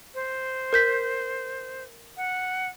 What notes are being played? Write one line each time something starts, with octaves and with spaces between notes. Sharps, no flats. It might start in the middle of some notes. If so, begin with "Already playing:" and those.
C5
A#4 G6 B6
F#5